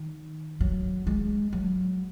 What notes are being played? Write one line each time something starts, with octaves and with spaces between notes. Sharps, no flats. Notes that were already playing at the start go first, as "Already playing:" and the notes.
Already playing: D#3
F#3
G#3
F#3